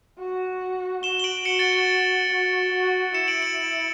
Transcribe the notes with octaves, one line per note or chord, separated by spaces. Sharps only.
F#4
F#4 E7 G7
G7
D7 F#7
F#4 C#7 E7
A6 C#7
A6
F#4
F#4
E4 C#7 E7
D7 F#7
D7 F#7